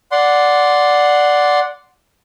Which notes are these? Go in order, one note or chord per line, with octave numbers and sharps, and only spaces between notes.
D5 F#5 C6